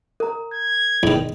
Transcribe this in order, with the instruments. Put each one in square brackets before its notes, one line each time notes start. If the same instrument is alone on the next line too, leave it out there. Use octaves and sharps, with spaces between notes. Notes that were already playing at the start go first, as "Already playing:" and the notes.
[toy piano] A#4 A#5
[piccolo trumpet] G#6
[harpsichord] E2 D#3